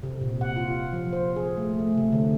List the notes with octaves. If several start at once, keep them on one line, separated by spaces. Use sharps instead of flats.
C3
A#2
F#5
F4
F3
C5
G#4
A3
A3
C3
D3